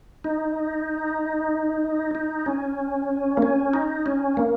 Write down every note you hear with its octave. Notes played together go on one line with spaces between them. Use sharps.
D#4
D#4
C#4
A#3
C#4
D#4
C#4
A#3